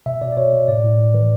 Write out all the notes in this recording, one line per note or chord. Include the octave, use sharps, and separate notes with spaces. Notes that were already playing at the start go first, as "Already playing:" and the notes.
B2 E5
B2 D5
D5
B2 C#5
B2
A2 D5
A2
A2
E3 B4